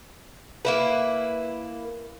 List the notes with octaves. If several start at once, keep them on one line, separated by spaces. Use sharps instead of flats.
A#3 E4 B4